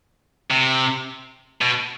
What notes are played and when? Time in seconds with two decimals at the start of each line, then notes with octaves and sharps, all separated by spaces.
0.50 C3
1.62 B2